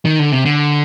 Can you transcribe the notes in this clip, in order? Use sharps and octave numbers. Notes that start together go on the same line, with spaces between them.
D#3
D3
C3
D3